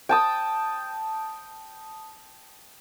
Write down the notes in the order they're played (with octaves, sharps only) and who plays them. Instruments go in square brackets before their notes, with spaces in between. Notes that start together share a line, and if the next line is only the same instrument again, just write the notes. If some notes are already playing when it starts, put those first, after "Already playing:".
[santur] G5 A5 D#6